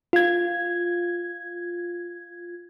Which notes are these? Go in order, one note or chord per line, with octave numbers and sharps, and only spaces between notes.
F4 G#6